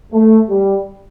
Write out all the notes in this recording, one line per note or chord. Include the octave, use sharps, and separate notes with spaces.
A3
G3